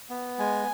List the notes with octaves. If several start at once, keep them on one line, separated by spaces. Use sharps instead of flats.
B3
G#3 G#5